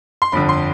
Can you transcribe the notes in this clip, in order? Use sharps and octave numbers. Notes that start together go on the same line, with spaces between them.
C6
G1 F2 D3 B5
C6